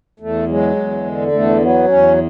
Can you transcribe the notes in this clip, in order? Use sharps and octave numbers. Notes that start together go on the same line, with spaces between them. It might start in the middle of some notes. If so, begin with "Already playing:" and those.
E2 A3
F#3 G#3
E2
D3
E2 A3
F#3 B3
E2 C#4